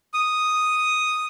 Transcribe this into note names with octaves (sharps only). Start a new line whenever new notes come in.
D#6